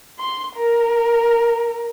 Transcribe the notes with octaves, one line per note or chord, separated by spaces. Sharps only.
C6
A#4